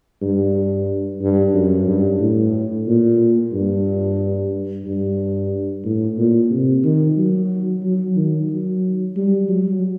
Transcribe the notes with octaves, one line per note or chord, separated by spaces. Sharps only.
G2
G2
F#2
G2
A2
A#2
G2
G2
A2
A#2
C3
D#3
F#3
F#3
D#3
F#3
G3
F#3